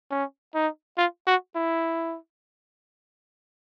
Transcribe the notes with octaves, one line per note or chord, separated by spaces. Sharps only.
C#4
D#4
F4
F#4
E4